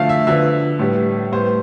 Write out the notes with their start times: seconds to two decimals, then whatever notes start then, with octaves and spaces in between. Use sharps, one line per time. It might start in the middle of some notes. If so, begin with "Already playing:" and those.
Already playing: D3 F3 A3 F5
0.09 E5
0.27 D3 F3 B3 E5
0.79 A2 G3 B3
1.32 A2 G3 B3 C5